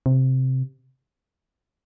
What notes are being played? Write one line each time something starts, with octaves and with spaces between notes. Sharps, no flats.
C3